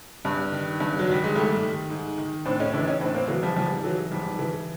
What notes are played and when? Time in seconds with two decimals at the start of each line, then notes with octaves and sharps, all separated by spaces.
0.25 G2
0.52 D#3
0.80 G2
0.99 F#3
1.08 D#3 G3
1.24 G#3
1.35 G#2 G3 A3
1.63 D#3
1.90 G#2
2.18 D#3
2.46 A2 C4 D4
2.60 C#4 D#4
2.73 E3 D4 E4
2.87 C#4 D#4
3.01 A2 C4 D4
3.14 A#3 C4
3.28 E3 F#3
3.43 F3 G3
3.56 G#2 F3 G3
3.84 E3 F#3
4.12 G#2 F3 G3
4.39 E3